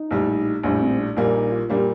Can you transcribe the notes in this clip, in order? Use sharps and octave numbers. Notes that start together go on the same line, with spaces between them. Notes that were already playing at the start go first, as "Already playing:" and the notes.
Already playing: D#4
A#1 A2 G3
A#1 A2 G3 D4
C4
D4
A#1 A#2 G3 A#3 D#4
D#4
F4
A#2 G3 A#3 D4
G4